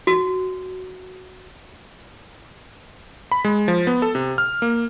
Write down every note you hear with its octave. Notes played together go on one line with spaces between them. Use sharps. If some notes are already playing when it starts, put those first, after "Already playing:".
F#4
B5
G#3
F3
B3
A4
C3
F6
A#3